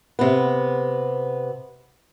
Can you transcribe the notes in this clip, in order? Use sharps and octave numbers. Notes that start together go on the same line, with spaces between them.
C3 B3